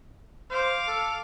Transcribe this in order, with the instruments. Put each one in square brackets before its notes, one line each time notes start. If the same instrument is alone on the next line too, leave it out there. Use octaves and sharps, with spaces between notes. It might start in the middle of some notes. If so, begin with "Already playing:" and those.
[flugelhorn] C5 [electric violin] F5 D6
[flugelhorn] A4